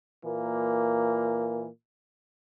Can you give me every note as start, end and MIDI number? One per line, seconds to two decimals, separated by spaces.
0.25 1.68 46
0.25 1.68 52
0.25 1.68 58